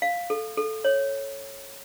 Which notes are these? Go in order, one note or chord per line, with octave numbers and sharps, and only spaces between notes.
F5
A4
A4
C#5